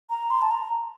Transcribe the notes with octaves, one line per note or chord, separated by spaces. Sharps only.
A#5
C6
A5
A#5